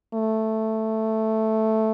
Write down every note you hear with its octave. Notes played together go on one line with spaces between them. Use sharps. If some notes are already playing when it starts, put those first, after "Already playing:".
A3